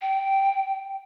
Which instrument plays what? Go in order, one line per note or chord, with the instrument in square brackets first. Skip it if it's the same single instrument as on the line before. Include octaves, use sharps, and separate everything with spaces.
[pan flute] G5